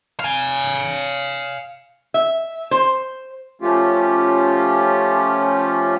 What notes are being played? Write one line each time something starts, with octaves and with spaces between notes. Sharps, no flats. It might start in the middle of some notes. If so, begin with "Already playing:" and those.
F5 G#5
E5
C5
F3 A3 C#4 F4 G4